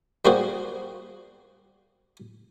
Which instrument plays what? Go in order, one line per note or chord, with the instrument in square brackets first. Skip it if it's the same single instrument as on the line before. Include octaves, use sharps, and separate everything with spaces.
[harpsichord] G3 A#3 F4 F#4 G#4 C5